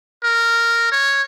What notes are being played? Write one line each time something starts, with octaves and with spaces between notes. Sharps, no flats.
A#4
C#5